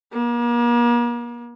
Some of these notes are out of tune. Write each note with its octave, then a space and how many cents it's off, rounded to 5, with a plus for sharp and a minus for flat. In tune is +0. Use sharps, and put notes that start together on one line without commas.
A#3 +40